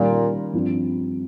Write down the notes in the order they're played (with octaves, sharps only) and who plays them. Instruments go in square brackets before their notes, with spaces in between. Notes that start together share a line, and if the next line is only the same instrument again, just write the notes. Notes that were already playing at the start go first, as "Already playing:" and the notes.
Already playing: [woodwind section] A#2 [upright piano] D#3 G3 C#4
[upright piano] G2 F3 C4